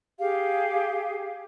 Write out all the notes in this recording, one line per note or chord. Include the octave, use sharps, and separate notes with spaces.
G4 G#4 F5